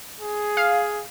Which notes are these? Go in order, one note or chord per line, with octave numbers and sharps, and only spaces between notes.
G#4
F5